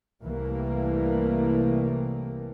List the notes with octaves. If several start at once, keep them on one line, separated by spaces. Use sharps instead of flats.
C2 E3 G3 A3 A#3